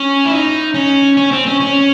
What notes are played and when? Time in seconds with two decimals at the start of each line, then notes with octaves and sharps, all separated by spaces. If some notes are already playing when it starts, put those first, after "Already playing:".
Already playing: C#4
0.25 E4
0.32 D#4
0.74 C#4
1.17 C#4
1.31 C4
1.46 C#4
1.60 C#4